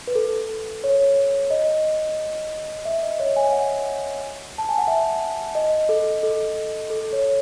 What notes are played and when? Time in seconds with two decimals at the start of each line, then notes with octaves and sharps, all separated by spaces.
0.07 B4
0.15 A4
0.84 C#5
1.50 D#5
2.85 E5
3.03 D#5
3.20 C#5
3.36 G#5
3.52 F#5
4.58 A5
4.69 G#5
4.78 F#5
4.87 E5
5.55 D#5
5.89 A4
6.23 A4
6.90 A4
7.13 C#5